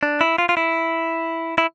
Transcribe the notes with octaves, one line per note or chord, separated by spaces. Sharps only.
D4
E4
F4
F4
E4
E4